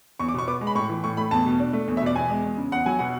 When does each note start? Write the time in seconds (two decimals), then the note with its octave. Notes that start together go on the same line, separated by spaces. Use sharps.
0.19 E2 C#6
0.28 D6
0.34 B2 C#6
0.48 B3 D6
0.61 G#3
0.67 B5
0.75 A2 C#6
0.89 E3
1.04 A2 C#6
1.17 A3 B5
1.31 E2 A5
1.46 B2
1.60 D4
1.73 A3
1.88 E2
1.97 E5
2.01 B2
2.06 D5
2.15 E2 G#5
2.30 G#3
2.44 E2
2.58 C#3
2.72 E2 F#5
2.86 F#3 G#5
2.99 B2 F#5